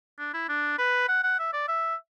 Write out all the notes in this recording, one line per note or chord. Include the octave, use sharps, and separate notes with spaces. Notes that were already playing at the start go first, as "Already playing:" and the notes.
D4
E4
D4
B4
F#5
F#5
E5
D5
E5